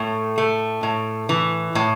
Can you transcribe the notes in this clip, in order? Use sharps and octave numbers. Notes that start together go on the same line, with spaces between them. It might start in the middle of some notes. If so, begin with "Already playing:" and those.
Already playing: A2 A3
A3
A2
E3
A2